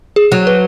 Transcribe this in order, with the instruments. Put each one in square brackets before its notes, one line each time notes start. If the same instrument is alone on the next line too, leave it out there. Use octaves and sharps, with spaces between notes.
[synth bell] G#4
[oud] F#3
[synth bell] B4